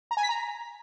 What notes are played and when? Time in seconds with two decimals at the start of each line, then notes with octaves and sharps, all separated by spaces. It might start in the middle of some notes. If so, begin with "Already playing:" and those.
0.11 A#5
0.17 G#5
0.23 B6
0.29 A#5